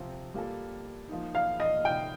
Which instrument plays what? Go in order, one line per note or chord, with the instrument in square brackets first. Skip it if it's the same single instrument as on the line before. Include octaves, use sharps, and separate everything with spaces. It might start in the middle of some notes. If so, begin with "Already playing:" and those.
Already playing: [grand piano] C3 F3 C4 F4
G3 A#3 F4 A4
F3 A#3 D#4
[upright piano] F5
D#5
[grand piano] C3 D#3 A#3 F4 [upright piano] G5